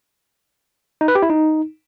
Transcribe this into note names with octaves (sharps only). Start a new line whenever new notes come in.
D#4
B4
G4
E4
D#4